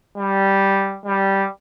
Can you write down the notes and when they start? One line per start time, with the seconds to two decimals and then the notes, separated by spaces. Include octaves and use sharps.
0.18 G3
1.06 G3